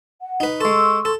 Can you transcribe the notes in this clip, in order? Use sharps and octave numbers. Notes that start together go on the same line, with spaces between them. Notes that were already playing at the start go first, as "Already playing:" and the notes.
F#5
D#4 B4
G#3 A4 C6 C#6 E6
A4